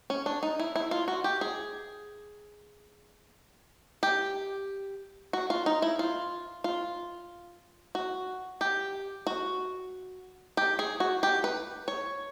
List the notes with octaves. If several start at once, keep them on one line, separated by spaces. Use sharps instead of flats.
C#4
D4
D#4
E4
E4
F4
F#4
G4
G#4
G4
F#4
F4
D#4
E4
F4
F4
F#4
G4
F#4
G4
G#4
F#4
G4
B4
C#5